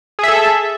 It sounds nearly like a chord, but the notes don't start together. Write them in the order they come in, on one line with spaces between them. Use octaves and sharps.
G#4 E5 A4